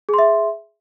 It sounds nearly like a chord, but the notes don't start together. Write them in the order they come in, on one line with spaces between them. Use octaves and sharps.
G#4 C6 E5